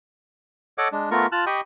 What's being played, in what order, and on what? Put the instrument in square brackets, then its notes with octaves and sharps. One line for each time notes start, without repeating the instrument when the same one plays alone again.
[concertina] A4 C#5 D#5 F#5 D6
G#3 D4
A3 B3 F4 A#4 C#6
F4 A5 F6 F#6
G4 D#5 G5 B5 C#6 D#6